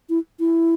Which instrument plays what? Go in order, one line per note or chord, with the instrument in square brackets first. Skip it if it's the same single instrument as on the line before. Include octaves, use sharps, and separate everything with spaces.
[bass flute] E4
E4